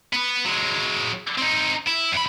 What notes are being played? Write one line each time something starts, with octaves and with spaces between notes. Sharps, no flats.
B3 B4
F#3 G#3
C4 D#4
E4
E2 B5